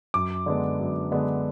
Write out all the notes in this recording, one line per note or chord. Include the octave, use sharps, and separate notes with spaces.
F#2 D6
D3 G#3 B3 D4
F#2
D3 G#3 B3 D4